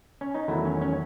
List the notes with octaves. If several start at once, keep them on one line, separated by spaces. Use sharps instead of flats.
C#4
D#4
E2 D#3 F#3 A3 E4
C#4
C#4